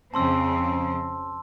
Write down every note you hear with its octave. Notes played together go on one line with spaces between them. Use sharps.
F2 C#3 C4 A5 C6 E6